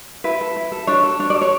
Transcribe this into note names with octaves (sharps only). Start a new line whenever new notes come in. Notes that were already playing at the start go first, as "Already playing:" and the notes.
E4 B4
A4
E4
A4
D4 C#5
A4
D4 C#5
D5
A4
C#5